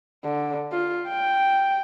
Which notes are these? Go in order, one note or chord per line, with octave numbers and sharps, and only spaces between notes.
D3
F4
G5